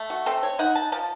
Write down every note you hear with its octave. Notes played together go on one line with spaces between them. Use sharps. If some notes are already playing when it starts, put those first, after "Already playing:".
Already playing: A3
F#4
C4 A4
C#5
D#4 F#5
A5
F3 A5